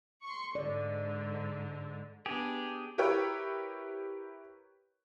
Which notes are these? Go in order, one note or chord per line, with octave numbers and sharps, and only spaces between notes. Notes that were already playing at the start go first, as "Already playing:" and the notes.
C6 C#6
G#2 D3 D5
B3 D4 G4 G#4
E4 G4 A#4 B4 C#5 G5